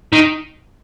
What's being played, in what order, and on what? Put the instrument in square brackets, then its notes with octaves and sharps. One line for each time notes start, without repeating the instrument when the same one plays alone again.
[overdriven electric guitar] D#3